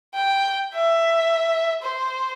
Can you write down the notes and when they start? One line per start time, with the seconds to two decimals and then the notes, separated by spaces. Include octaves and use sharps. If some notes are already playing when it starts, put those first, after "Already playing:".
0.15 G5
0.75 E5
1.83 C5